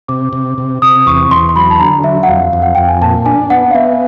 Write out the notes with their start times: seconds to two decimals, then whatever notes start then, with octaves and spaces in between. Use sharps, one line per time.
0.08 C3 D6
0.33 C3
0.58 C3
0.82 C3 D#6
1.06 E2 C#6
1.31 E2 C6
1.49 C6
1.56 F#3 B5
1.70 A5
1.80 D3 A#5
2.04 F#3 E5
2.23 F#5
2.28 F2 F5
2.53 F2
2.62 F#5
2.75 F2 G5
2.88 G#5
3.02 A#2 A5
3.26 D4 G#5
3.50 B3 F#5
3.71 F5
3.75 B3 E5